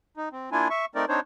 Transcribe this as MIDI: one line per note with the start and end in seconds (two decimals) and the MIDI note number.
0.17 0.29 63
0.32 0.50 60
0.52 0.68 58
0.52 0.68 62
0.52 0.68 64
0.52 0.68 65
0.52 0.68 80
0.70 0.85 76
0.70 0.85 85
0.95 1.05 57
0.95 1.05 60
0.95 1.05 63
0.95 1.05 70
0.95 1.05 74
1.09 1.20 60
1.09 1.20 62
1.09 1.20 63
1.09 1.20 72
1.09 1.20 73